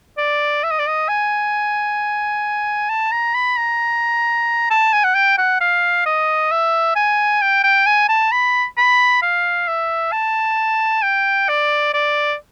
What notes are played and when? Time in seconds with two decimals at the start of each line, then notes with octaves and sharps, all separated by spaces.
0.18 D5
0.64 E5
0.71 D#5
0.79 D5
0.88 D#5
1.08 G#5
2.89 A5
3.12 A#5
3.34 B5
3.57 A#5
4.70 A5
4.93 G#5
5.04 F#5
5.15 G5
5.38 F#5
5.61 F5
6.06 D#5
6.51 E5
6.96 G#5
7.42 G5
7.64 G5
7.86 G#5
8.09 A5
8.32 B5
8.78 B5
9.22 F5
9.68 E5
10.12 A5
11.03 G5
11.49 D5
11.94 D5